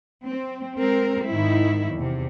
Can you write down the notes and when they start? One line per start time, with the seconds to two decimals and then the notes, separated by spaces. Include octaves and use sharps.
0.22 C4
0.76 G#3 C4 A#4
1.28 G#2 D#3 D#4 E4
1.92 E2 C3